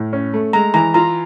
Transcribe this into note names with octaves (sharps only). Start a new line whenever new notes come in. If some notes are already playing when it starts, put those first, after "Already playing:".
Already playing: A2
C#4
A3
G#3 A#5
E3 A#5
F4 A#5